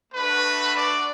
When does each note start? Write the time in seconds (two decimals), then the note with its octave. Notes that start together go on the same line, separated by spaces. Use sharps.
0.13 A3 D4 F#4 B4
0.76 D5